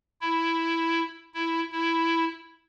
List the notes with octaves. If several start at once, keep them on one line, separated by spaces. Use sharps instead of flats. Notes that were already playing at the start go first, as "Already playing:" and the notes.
E4
E4
E4